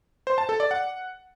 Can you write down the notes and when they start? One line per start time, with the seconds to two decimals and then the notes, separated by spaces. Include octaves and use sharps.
0.27 C5
0.38 A5
0.49 A4
0.60 D5
0.71 F#5